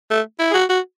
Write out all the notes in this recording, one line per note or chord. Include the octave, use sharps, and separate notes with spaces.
A3
E4
G#4
F#4
F#4